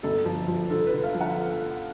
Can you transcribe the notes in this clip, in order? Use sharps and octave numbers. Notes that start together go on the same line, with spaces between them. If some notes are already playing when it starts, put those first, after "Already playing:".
G1 A4
F3
F3
D3 A4
B4
D3
F5
F3
F#5